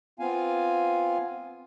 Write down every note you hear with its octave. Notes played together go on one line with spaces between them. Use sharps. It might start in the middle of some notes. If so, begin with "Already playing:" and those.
B3 C4 F4 F5 G#5